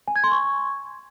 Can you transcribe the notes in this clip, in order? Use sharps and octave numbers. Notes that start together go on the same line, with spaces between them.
G#5
G#6
C6
C#6